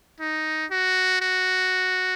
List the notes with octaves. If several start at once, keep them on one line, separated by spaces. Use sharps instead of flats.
D#4
F#4
F#4